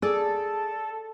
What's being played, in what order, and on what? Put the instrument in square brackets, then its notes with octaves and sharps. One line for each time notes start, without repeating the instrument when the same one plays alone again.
[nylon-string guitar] G#4 D5 [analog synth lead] A4